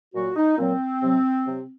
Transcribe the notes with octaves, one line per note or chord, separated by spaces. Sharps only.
A#2 F#3 F#4
D#4
A#2 F#3 C4
C3 F#3
C3 F#3